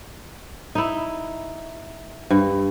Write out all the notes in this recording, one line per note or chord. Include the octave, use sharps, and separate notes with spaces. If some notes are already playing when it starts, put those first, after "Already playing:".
D#4 E4
G2